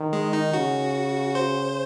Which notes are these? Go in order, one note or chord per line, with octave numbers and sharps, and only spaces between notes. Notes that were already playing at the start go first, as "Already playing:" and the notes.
Already playing: D#3
G#3
D#4
C#3 F#4
C5